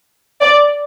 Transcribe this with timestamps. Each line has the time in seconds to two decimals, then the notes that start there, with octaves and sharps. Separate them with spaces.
0.42 D5